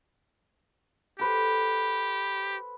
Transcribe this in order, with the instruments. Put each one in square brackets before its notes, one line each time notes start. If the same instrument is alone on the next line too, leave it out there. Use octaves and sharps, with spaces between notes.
[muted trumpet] G4 [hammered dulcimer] A4 B4 C5